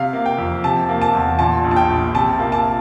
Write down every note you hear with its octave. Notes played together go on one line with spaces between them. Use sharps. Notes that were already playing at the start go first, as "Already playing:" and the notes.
Already playing: C3 F5
A#3
G5
F2
C3 A5
A#3
A5
E2
A#2 A5
A#1
A5
G5
A#1
C3 A5
A#3
A5